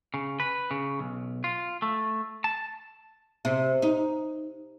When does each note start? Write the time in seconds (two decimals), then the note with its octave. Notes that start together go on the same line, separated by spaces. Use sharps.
0.14 C#3
0.40 B4
0.71 C#3
0.99 B1
1.44 F4
1.82 A3
2.44 A5
3.45 C3
3.82 D#4